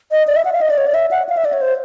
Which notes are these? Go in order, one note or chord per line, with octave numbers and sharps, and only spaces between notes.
D#5
D5
E5
F#5
F5
D#5
D5
C#5
D5
E5
F#5
F5
E5
D5
C#5
C5